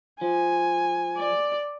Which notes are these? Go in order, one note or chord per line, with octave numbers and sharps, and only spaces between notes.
F3 G#5
D5